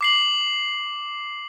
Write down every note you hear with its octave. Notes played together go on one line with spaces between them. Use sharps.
D6 C7 F#7